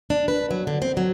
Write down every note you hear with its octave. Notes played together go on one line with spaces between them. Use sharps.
D4
B4
F#3
D3
C4
F#3